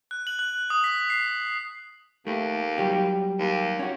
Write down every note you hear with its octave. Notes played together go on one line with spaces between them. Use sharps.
F#6
F#7
F#6
D#6
B6
C7
D#2 A3
F#3 G3 G4
D#2
C#4 F#4